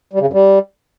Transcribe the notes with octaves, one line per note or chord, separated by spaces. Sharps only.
G3
C#3
F#2
G3